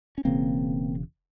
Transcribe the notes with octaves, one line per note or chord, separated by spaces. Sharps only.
C#4
E1 E2 C#3 A#3 C4